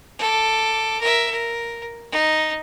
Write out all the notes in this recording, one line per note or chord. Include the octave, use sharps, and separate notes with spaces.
A4 D6
A#4 E5
A#4
D#4